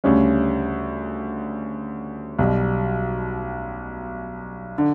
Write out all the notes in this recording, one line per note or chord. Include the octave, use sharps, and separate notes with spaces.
D2 C#3 G3 C#4
B1 B2 G3
D3